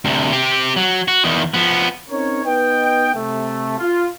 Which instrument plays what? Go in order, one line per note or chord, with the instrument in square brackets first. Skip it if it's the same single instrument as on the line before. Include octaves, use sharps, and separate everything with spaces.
[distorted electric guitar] D2 C3
C4 G4
F#3
F#4
E2 D#3
F3 B3
[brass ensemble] C4 C#4 D#4 A#4 C#5
B3 D#4 B4 D#5 G5
C3 A3
F4